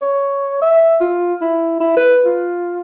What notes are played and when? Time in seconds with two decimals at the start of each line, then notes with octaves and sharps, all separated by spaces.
0.02 C#5
0.62 E5
1.01 F4
1.41 E4
1.80 E4
1.97 B4
2.25 F4